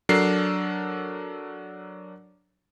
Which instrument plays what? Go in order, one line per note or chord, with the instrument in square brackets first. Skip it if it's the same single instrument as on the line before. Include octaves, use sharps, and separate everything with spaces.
[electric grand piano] F#3 D4 A4 A#4 C7